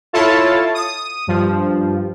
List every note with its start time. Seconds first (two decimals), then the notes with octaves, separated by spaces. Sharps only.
0.13 E4 F4 A4 C#5 A5
0.74 D#6
1.27 G2 F3